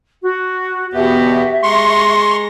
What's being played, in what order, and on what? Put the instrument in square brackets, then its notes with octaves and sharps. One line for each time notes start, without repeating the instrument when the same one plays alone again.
[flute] F#4
[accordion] E2 B2 B3 [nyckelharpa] F#4 G4 [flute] E5
[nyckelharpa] G#3 A#5 [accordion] C6 C#6